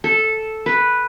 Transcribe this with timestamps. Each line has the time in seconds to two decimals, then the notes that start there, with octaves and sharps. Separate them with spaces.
0.04 A4
0.66 B4